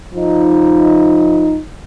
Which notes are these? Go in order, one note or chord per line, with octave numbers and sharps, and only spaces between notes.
F3 D#4